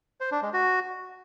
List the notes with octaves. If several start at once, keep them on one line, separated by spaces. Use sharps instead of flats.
C5
D4
G#3
F#4